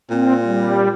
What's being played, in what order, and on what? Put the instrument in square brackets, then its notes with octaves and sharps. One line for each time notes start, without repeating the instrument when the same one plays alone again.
[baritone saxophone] A#2 [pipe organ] C4
[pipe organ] G3